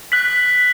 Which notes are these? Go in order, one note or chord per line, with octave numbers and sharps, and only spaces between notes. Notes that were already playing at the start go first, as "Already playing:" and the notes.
F#6 B6 F#7